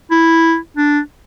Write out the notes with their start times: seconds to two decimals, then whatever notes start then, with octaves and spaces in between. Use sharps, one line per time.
0.11 E4
0.77 D4